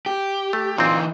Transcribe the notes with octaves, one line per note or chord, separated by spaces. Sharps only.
G4
A3
A#2 E3 C4 D#4